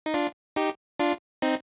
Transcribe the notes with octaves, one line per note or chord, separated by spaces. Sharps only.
D#4
D4 F4
D#4 G4
D4 F4
C4 D#4